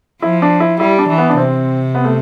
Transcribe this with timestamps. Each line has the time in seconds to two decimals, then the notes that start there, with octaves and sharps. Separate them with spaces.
0.22 F3 E4
0.42 D4
0.60 E4
0.80 G3 E4
0.99 D4
1.09 E3
1.18 B3
1.29 D4
1.37 C3 C4
1.95 B3
2.05 A3